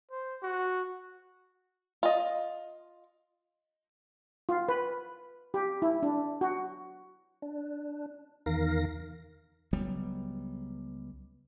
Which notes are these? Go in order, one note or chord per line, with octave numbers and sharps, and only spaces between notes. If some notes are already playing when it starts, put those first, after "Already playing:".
C5
F#4
F4 D#5
F4
B4
G4
E4
D4
F#4
D4
E2 D#3 A#4 F5 A#6
C#2 F#3 G3 B3